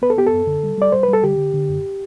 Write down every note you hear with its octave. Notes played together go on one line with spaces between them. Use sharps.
B3 B4
A4
B3 G4
A4
F#2
D3
G3
G3 D5
G3 C5
B4
G3
A4
D3 G4
D3
D3
F#2